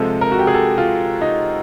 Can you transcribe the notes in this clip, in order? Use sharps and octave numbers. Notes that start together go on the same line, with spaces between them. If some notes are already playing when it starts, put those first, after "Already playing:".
Already playing: C3 F3 G#3 A4
A#4
F#4
G4
G#4
A4
F4
D#4